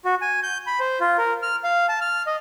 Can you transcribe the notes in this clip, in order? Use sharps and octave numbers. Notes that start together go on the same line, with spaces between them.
F#4
G#5
G6
B5
C5
F4
A#4
F6
F5
A5
F6
D#5